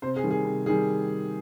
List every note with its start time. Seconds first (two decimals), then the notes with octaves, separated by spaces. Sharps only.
0.02 C3 C5
0.16 G#4
0.24 D#3 G3
0.31 G#4
0.45 C3
0.66 D#3 G3 G#4